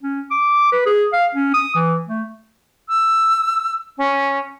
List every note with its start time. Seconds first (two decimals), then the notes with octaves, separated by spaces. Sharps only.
0.03 C#4
0.31 D6
0.72 B4
0.86 G#4
1.13 F5
1.35 C#4
1.54 D#6
1.75 E3
2.09 A3
2.89 E6
3.98 C#4